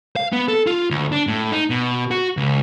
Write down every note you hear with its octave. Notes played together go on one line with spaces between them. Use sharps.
F5
B3
A4
F4
D2
D4
A2
D#4
B2
F#4
C#2